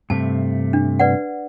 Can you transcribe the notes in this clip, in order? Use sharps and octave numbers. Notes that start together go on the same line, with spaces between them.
G2 C3 A3 A5
D4
B4 D5 F#5